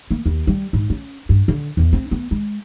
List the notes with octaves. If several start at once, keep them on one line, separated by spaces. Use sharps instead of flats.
A#3
D#2
G3
G#2
C#4
G2
D3
E2
C4
B3
G#3